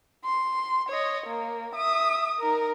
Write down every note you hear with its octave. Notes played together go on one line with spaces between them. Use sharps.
C6
C#5 D#5
A#3
E5 D#6
D#4 A#4